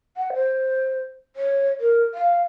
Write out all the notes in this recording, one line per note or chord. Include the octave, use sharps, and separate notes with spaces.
F#5
C5
C#5
A#4
F5